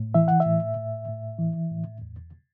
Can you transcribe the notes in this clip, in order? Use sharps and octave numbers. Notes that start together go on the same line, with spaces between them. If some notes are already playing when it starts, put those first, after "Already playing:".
Already playing: A2
E3 E5
F#5
E5
A2
A2
A2
E3
A2
E2